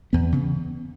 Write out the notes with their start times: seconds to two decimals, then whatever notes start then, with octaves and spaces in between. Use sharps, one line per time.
0.13 E2 B3
0.32 C#3